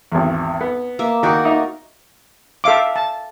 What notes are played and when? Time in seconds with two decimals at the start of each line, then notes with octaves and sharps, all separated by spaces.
0.12 G#1 E2
0.61 B3
0.99 A#3 E5
1.23 D#3 F#4 A#4 D5
1.45 D#4 E5
2.64 A4 E5 F5 D6
2.96 A5